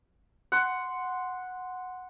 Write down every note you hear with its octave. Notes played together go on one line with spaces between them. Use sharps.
F#5 C6